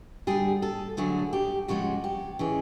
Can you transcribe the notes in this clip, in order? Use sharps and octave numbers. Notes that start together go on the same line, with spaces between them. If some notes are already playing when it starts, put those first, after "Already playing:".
D3 G3 G#4
A4
D3 F#3 A3 G#4
G4
C#3 F3 G#3 F#4
G4
C#3 E3 G#3 G#4